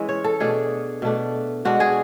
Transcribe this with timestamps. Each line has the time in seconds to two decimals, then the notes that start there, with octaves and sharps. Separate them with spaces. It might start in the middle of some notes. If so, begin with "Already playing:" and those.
Already playing: E3 G#3 C#4 E5
0.09 C#5
0.24 A4
0.40 B2 A3 D4 G#4
1.02 B2 A3 D4
1.65 B2 G#3 D4 F#4
1.80 G#4